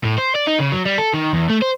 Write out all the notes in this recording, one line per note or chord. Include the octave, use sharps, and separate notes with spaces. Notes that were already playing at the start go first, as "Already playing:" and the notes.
A2
C5
D5
D#4
C#3
F#3
G3
A4
D#3
E2
A3
C5